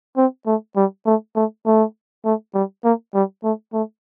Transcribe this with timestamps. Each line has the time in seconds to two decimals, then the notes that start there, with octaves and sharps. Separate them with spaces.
0.17 C4
0.46 A3
0.76 G3
1.06 A3
1.36 A3
1.65 A3
2.25 A3
2.54 G3
2.84 A#3
3.14 G3
3.43 A3
3.73 A3